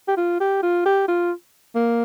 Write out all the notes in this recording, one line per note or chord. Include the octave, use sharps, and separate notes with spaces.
G4
F4
G4
F4
G4
F4
A#3